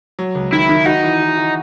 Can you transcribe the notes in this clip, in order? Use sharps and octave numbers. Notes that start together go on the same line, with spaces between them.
F#3
C#2
D#3 E4
D#3
D#4 F#4
E3
E3
E3